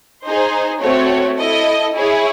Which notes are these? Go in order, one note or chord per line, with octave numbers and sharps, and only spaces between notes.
D#4 G#4 C5
A3 C4 F#4 C#5
E4 A4 D#5
E4 G#4 C#5